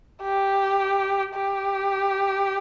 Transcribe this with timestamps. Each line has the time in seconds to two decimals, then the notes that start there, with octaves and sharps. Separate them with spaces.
0.22 G4
1.35 G4